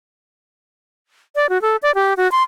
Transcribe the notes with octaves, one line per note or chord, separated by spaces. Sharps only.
D5
F#4
A4
D5
G4
F#4
C6